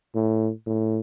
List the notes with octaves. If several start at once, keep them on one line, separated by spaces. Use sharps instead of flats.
A2
A2